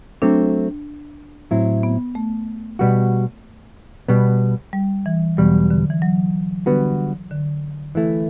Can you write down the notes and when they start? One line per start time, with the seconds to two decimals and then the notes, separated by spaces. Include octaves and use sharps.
0.22 F#3 A3 C4 D4
1.51 A2 F#3 C4 E4
1.83 B3
2.15 A3
2.79 B2 G3 B3 F#4
4.08 B2 G3 B3
4.73 G3
5.06 E3
5.37 E2 B2 F#3 G3
5.70 D3
5.90 E3
6.02 F#3
6.66 D3 G3 B3 F#4 B4
7.31 D3
7.95 E3 A3 E4